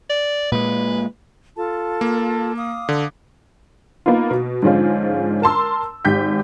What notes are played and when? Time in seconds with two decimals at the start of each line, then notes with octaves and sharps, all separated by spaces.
0.10 D5
0.52 A#2 G#3 B4
1.57 F4 A4 A5
2.01 A#3
2.56 F5 D6 D#6
2.89 D3
4.06 A#3 B3 D#4 F4
4.31 B2
4.63 G#2 D3 F3 G#3 C#4 F4
5.42 A#4 A5 C6 E6
6.05 G#1 G#2 G4 G6 B6